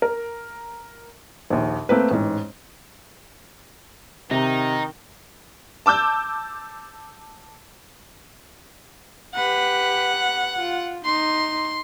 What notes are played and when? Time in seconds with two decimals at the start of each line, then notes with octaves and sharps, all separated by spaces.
0.02 A#4
1.50 A#1 D#2
1.89 A3 A#3 C4 B4
2.11 A1 G#2
4.31 C3 D#3 D#4
5.86 A5 D6 E6 G6
9.35 G4 B4 F#5
10.58 F4
11.05 D#4 C6